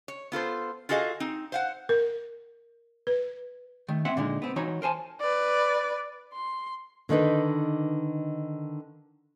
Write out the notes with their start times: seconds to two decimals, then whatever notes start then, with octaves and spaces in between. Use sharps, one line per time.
0.08 C#5
0.32 B3 F4 A4 C5
0.89 F4 F#4 G#4 A4 D#5 F5
1.20 C4 D#4
1.52 C5 F5 F#5
1.89 A#4
3.07 B4
3.88 D#3 A3
4.05 C4 E5 F#5
4.17 A#2 D3 G#3 D#4
4.42 B3 C4
4.56 E3 F#3 D#4 F#4 C#5 A#5
4.82 A#4 C5 G#5 A5
5.20 B4 D5
6.34 C6
7.09 D3 D#3 D4 D#4 B4